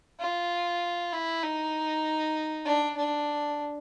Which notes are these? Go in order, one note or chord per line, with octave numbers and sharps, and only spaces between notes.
F4
E4
D#4
D4
D4